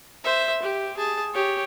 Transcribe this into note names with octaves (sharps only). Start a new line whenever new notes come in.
C5 E5
G4
G#4 A5
G4 C#5